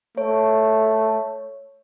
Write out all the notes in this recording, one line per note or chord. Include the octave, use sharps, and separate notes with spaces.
A3 C#5